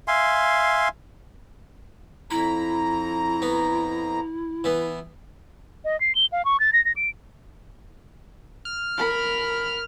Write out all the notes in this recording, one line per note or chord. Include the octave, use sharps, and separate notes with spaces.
E5 F5 G#5 C6
F2 E4 A#5 B5
B3
E3 B3
D#5
C7
G7
F5
C#6
A6
A#6
A#6
D7
F6
A#4 B5